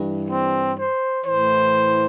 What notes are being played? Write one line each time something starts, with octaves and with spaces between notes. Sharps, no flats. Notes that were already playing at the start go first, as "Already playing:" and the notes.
Already playing: G2 E3
C4
C5
A2 E3 C5